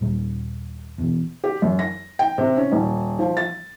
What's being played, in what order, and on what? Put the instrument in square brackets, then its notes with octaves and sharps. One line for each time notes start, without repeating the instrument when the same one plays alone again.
[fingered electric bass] D#1 G3
E1 E2
[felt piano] G4
F#2
A#6
G5
C3
C#4
D#1
F3
A6